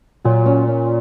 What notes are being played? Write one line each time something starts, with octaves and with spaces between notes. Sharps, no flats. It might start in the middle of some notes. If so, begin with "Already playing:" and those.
A#2 F#3
C#4
C#4